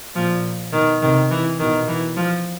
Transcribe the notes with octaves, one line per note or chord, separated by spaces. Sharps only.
A#2 F3
B2 D#3
C3 D#3
E3
B2 D#3
E3
F3